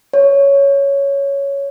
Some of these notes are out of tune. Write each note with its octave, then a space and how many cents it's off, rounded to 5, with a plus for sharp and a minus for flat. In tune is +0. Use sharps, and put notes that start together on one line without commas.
C#5 +5